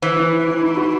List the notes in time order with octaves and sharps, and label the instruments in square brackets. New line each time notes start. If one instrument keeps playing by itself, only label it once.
[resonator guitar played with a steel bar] E3 [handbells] C5
[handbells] E4
C5
E4
D#4
F#4